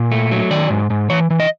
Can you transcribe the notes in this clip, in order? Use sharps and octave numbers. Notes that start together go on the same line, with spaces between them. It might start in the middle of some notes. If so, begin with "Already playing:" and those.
Already playing: A#2
A3
F#3
D#3 D5
G#2
G#2
E3 C#5
E3
D#5